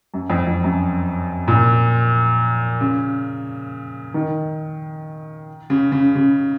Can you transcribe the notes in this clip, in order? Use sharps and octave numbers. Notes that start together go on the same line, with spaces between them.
F#2
F2
F2
F#2
A#2
C#3
D#3
C#3
C#3
C#3